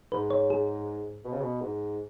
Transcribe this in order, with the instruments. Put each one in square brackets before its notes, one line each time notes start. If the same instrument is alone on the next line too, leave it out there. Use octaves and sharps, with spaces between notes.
[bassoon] G#2 [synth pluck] B4
[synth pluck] C#5
G#4
[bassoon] B2
C#3
B2
G#2